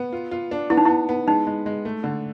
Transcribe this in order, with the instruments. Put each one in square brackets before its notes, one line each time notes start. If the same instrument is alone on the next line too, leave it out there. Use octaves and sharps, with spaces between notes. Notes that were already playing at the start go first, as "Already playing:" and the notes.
Already playing: [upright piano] B3
F4
F4
D4
[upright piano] B3 [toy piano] E4
[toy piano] D#4
[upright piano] B3 [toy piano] E4
[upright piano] B3
[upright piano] G#3 [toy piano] D#4
[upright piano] G#3
G#3
A3
D3